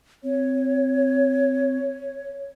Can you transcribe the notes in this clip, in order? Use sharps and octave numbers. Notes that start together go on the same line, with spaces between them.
C4 C#5